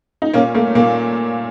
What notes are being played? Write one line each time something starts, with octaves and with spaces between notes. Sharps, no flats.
D#4
A#2 A#3 C#4
A3 A#3
A#2 A#3